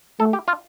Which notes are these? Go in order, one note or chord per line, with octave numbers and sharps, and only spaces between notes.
A3 A4
G4
F4